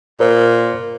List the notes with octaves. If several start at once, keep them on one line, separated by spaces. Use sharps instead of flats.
A#2 A#4 C5